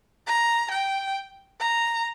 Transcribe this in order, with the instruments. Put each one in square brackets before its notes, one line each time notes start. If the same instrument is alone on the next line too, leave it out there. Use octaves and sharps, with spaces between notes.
[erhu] A#5
G5
A#5